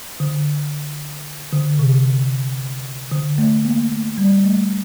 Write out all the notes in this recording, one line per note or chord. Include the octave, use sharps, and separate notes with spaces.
D3
D3
C3
D3
A3
A#3
A3
G3
A3